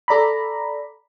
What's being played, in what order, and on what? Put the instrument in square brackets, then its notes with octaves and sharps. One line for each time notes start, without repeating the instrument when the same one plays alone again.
[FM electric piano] A4 D5 A#5 B5